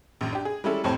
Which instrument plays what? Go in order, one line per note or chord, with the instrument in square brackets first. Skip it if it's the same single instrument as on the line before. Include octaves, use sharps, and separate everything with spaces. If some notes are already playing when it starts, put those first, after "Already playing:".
[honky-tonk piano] A#1 F#2
D4 G4
G#4
G3 G#3 C#4 E4 A4
F1 F2 A2 C5 C#5 A5